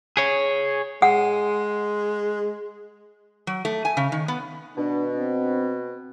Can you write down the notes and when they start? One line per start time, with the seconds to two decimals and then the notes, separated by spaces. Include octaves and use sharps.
0.17 G#4 C#5
1.02 G#3 F#5
3.47 F#3
3.65 A3
3.85 G#5
3.97 C#3
4.12 D#3
4.28 B3
4.77 B2 D4
5.18 C4